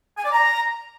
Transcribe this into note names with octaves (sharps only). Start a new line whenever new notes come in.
G#5
D5
A#5